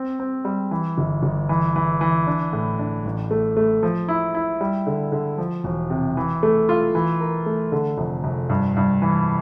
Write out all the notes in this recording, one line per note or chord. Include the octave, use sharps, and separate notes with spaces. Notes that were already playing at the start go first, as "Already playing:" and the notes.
Already playing: C4
C4
G3
E3
G1
G1
E3
E3
E3
D4
A2
D4
A1
A3
A3
F3
E4
E4
G3
D3
D3
F3
E1
C3
E3
A3
F4
E3
A#4
A3
D3
F1
F1
G2
G2
E3